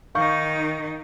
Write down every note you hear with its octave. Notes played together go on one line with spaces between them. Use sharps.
D#3 D#4 F5 C#6 G6